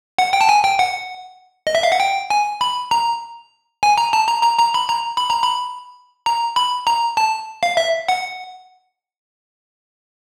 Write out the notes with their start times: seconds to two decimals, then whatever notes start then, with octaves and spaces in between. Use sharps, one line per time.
0.18 F#5
0.33 G5
0.41 A5
0.49 G#5
0.64 G5
0.79 F#5
1.67 D#5
1.75 E5
1.83 F5
1.92 F#5
2.00 G5
2.30 G#5
2.61 B5
2.91 A#5
3.83 G#5
3.98 A#5
4.13 A5
4.28 A#5
4.43 A#5
4.59 A#5
4.74 B5
4.89 A#5
5.17 B5
5.30 A#5
5.43 B5
6.26 A#5
6.56 B5
6.87 A#5
7.17 A5
7.63 F5
7.77 E5
8.08 F#5